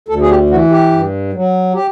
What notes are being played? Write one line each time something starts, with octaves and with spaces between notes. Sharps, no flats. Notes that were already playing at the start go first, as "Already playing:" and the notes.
D2 A4
G#4
G4
E3 F#4
G4
G2
F#3
G4